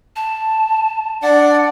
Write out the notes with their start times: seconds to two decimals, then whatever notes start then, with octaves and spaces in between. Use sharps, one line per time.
0.16 A5
1.23 D4 D5 F#5